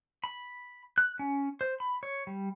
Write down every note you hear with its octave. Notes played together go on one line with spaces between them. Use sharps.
B5
F#6
C#4
C5
B5
C#5
G3